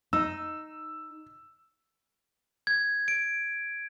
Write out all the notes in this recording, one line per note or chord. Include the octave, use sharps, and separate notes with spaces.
D#4 E6
G#6
D7